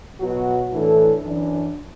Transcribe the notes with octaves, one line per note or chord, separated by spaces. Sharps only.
B2 F#3 B3 F#4
A2 E3 D4 A4
F#2 E3 D4